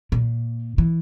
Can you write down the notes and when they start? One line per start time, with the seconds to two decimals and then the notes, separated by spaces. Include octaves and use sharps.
0.12 A#2
0.78 E3